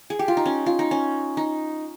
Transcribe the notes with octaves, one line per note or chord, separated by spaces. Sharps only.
G#4
G4
F4
D#4
C#4
F4
D#4
C#4
D#4